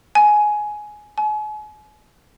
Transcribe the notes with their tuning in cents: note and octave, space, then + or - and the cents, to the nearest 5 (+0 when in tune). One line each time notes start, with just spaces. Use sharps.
G#5 +15
G#5 +40